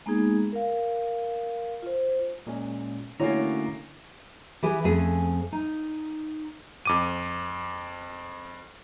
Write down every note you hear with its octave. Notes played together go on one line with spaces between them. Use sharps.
G#3 A#3 B3 D#4 G#4
A#4 F5
F4 C5
A#2 G#3 C#4
D3 A3 A#3 C#4 E4 F#4 C#5 A#5
E3 G4 G#4 G#5
F2 A3 C4 C#4 G#4 G#5
D#4
F2 D6 D#7